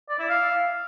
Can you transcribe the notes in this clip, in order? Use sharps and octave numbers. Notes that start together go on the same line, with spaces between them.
D5
E4
F5